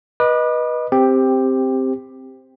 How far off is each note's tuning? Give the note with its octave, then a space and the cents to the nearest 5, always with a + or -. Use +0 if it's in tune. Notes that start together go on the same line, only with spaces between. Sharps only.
B4 -20 D#5 +0 D6 +35
C4 +0 G4 +10